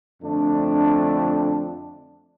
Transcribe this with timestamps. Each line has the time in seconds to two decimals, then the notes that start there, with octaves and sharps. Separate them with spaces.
0.22 F2 D3 A3 D4